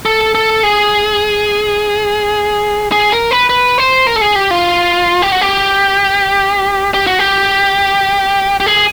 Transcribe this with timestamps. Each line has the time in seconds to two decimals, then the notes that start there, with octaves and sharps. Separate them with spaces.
0.05 A4
0.35 A4
0.63 G#4
2.92 G#4
3.12 A#4
3.31 B4
3.49 B4
3.78 C5
4.07 A#4
4.16 A4
4.21 G#4
4.36 G4
4.51 F4
5.22 G4
5.32 F#4
5.41 G4
6.94 G4
7.07 F#4
7.19 G4
8.60 G4
8.66 G#4